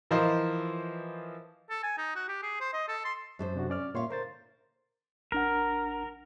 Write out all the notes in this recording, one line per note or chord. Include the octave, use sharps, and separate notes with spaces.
E3 F3 F4 A#4 C5 D#5
A4
G#5
D#4
F#4
G4
G#4
C5
D#5
A4
C6
F#2 A4 C5
C3 D4 F#4
C#4 D5 F6
A#2 C#5 E5 F5 C6
D3 A#4 C5 A6
A1 D4 A#4 F#5